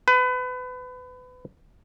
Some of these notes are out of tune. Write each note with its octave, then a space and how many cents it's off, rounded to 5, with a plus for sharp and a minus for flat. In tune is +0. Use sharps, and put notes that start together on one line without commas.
B4 +30